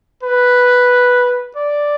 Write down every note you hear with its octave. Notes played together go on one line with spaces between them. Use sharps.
B4
D5